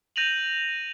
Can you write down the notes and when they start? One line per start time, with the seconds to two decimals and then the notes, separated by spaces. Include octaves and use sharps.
0.16 G6 A#6 D#7 F7 F#7